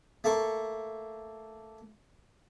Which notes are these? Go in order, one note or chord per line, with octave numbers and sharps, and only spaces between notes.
A3 A#3 C#6